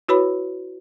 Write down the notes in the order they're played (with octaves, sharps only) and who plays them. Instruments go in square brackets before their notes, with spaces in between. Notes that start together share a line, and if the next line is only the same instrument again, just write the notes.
[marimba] E4 F#4 B4 C#5 B5